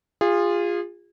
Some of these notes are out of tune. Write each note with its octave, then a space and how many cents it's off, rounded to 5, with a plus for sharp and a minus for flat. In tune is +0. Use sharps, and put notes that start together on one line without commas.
F4 +0 G#4 -30